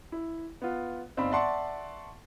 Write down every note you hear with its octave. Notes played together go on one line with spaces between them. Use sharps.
E4
B3 F4
G1 C4 D#4 D5 F5 B5
D5 E5 F#5 A5 C6 C#6